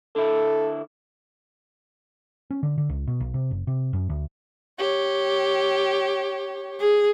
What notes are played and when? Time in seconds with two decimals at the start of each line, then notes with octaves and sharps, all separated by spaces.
0.16 D3 E4 A4
2.51 C#4
2.63 D3
2.78 D3
2.89 C#2
3.07 B2
3.20 B1
3.34 C3
3.51 F#1
3.67 C3
3.93 F#2
4.09 D2
4.79 G4 C#5
6.80 G#4